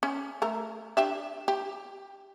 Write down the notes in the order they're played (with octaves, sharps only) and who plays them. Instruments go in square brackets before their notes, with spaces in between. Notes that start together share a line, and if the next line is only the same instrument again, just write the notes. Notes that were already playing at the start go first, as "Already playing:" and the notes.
[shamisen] C#4
A3 A#4
D4 G4 E5
G4